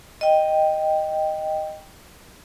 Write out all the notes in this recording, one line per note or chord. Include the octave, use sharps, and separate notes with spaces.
D#5 G5